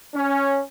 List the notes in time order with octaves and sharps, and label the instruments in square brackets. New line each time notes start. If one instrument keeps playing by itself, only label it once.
[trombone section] C#4